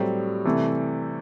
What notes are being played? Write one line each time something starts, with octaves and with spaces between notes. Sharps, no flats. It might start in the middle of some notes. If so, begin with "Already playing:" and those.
Already playing: A2 F#3 G3 C4 G4
C3 E3 A3